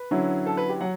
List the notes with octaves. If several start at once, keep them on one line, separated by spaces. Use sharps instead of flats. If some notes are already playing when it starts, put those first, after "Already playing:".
Already playing: B4
D3 F#3 C#4 E4
A4
B4
G4
F#3 F#5